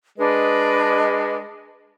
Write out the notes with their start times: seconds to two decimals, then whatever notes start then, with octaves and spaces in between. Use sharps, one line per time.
0.18 G#3 D4 B4 D#5